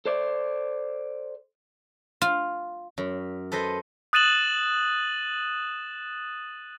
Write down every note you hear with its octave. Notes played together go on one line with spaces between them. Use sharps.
A4 C5 D5
F4
F#2
A4 B4 C5 D#5
D#6 F#6 A6 D#7 E7 F#7